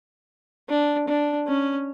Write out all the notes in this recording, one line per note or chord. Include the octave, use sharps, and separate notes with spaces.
D4
D4
C#4